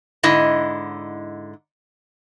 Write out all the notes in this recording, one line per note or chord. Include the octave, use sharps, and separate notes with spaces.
G#2 D3 E4 D#5